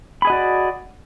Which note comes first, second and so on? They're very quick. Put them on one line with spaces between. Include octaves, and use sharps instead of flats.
B5 G#4 D#5 F#4 D5